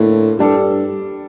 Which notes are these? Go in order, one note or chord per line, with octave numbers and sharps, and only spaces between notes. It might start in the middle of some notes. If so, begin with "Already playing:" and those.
Already playing: A2 D3 A#3
G2 G3 D4 A4